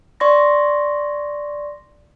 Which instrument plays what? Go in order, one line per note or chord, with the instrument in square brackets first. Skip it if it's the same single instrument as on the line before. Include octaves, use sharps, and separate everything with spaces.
[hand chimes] D5 C6 C#6 A#6